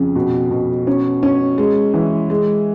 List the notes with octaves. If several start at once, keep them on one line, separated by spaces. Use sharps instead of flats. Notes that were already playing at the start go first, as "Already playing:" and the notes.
Already playing: F2 C#3
B2
B2
C#4
C#4
G#3
E3
G#3